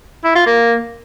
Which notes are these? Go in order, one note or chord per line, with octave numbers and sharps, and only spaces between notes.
E4
F4
A#3